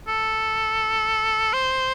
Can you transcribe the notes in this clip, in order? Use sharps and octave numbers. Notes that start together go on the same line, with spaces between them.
A4
C5